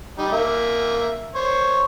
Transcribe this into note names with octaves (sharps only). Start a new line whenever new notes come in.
G3 D#4
A#3 E5
C5 C#5